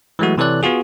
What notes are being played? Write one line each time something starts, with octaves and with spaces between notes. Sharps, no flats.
E3 F#3 G#3 A3 F#4
C3 E3 A4 C#5 D5 F#6
B3 F4 F#4 G#4